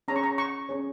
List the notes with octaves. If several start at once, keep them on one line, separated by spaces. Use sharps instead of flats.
C#4 G#4 C#5 A#5
C#6
A#5
C#6
C#4 G#4 C#5